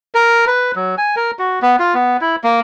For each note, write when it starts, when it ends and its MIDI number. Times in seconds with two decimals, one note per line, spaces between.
0.15 0.45 70
0.47 0.72 71
0.76 0.95 54
0.98 1.15 80
1.16 1.31 70
1.39 1.59 66
1.62 1.76 59
1.80 1.94 65
1.94 2.17 59
2.21 2.36 64
2.44 2.60 58